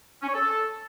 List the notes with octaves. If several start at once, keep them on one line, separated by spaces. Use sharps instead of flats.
C#4
C#5
A4